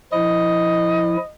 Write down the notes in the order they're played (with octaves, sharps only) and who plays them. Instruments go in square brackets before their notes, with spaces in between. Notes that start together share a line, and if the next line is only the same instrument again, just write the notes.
[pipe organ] F3 E4 [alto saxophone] D#5